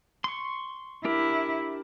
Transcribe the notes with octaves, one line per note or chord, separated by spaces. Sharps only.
C6 C#6
D4 E4 G4 A#4